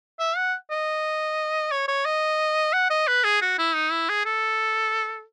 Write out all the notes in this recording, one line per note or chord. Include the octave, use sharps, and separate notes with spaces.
E5
F#5
D#5
C#5
C#5
D#5
F#5
D#5
B4
G#4
F#4
E4
D#4
E4
G#4
A4